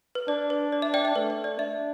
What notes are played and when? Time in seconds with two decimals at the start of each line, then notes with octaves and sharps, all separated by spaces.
0.15 B4
0.28 D4 D5
0.50 B4
0.72 D5
0.82 E5
0.94 D5 G5
1.05 E5
1.16 A3 B4
1.30 D5
1.44 D5
1.58 D4 E5